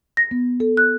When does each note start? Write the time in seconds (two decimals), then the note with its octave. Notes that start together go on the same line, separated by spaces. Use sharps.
0.17 A#6
0.31 B3
0.60 A4
0.77 F#6